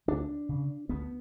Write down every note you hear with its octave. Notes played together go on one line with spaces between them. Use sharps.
D2 D4
C#3
D2 B3